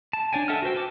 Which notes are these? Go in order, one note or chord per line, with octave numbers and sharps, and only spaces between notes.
A5
D4 C#5 D5 G5 G#5
A4 E5 F#5 A5 F6
F#4 B4 C5 G5
F#4 G#5 A5 D6